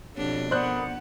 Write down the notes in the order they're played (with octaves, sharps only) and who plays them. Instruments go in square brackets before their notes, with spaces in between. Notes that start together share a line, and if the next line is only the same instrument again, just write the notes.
[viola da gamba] F2 B2 D4 [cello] B3 [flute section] G4 C#5
[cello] B3 F#5 [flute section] A#4 B5 D#6 [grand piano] C5 D5 F#6